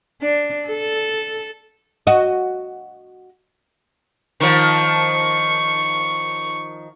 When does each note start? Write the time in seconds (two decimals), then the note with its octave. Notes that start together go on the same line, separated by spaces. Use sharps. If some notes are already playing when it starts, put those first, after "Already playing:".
0.22 D4
0.67 A4
2.07 F#4 D#5
4.40 D#3 F3 C#6